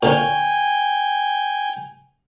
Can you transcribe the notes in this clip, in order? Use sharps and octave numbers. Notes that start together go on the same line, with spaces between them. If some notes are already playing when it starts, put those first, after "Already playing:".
A#2 D3 C#4 G5 G#5